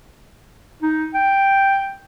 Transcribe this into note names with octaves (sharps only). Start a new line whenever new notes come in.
D#4
G5